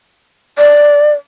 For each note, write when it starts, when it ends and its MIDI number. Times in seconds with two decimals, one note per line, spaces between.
0.58 1.13 74